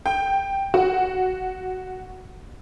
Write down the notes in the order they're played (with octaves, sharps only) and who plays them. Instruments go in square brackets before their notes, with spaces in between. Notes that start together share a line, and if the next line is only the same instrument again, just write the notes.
[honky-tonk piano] G5
F#4